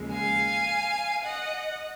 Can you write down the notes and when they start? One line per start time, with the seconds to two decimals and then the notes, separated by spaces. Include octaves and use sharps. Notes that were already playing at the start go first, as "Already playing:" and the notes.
Already playing: D#2 C#3 F3 G#3
0.12 F5 G#5
1.24 D#5 F#5